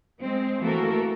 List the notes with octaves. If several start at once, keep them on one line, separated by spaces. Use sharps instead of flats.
G#3 C4
E3 A3 A#3 F#4 A4 A#4